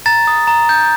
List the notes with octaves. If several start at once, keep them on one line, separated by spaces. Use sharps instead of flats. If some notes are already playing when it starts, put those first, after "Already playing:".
A#5 A6
D#6
A#5
G6